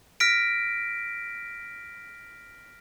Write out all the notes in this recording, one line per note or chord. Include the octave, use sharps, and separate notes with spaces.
F6 A#6 B6 D7